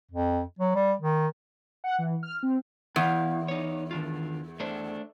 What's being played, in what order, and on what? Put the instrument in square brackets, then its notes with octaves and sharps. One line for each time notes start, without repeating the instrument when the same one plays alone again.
[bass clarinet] F2
F#3
G3
D#3
[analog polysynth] F#5
E3
F6
C4
[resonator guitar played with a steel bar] E2 [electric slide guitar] B3 E4 F5
[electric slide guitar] D#4 C#5
D#3 D4 F4
A3 D4 C5